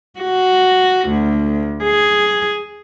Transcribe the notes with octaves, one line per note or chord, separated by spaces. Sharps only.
F#4
D2
G#4